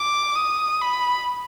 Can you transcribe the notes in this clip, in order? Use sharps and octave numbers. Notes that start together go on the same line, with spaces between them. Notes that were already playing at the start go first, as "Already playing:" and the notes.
Already playing: D6
D#6
B5